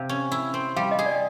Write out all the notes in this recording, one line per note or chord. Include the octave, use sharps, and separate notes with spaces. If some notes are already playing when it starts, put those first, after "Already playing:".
Already playing: C3 F5
C#4
E4
C4
G3 F5
D#5
G#4
D5